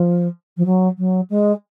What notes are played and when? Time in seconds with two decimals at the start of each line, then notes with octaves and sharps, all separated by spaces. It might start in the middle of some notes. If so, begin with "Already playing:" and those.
Already playing: F3
0.57 F3
0.65 F#3
0.98 F#3
1.30 G#3